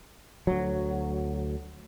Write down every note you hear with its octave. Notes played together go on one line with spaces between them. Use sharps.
D2 F#3